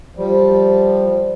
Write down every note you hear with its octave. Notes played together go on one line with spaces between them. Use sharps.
F3 G3